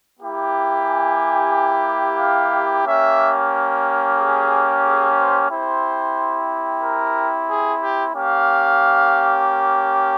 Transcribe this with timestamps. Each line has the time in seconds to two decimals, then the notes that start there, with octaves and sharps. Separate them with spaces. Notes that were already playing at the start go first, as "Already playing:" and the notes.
0.20 A#3 E4 G4
0.86 G#5
2.18 F5
2.84 A#3 C#4 G4 E5
4.16 G#4
4.83 G#4
5.15 C5
5.49 C4 E4 G4 C5
6.81 A#4
7.48 G#4
7.80 G4
8.13 A#3 C#4 G4 F5